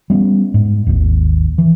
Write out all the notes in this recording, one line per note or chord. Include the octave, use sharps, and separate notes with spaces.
G3 B3 C#4
G#2
G#1 D#2
E3